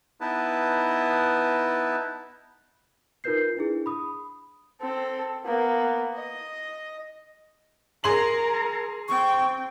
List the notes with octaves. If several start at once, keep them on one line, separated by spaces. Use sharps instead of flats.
B3 D#4 E4 B4 A5
D#4 F4 A#4 B4 G6 C7
D4 E4 G#4
B5 D#6
C4 A4
A#3 B3
D#5
G#4 A#4 A#5 C6 F#7
C4 G5 C#6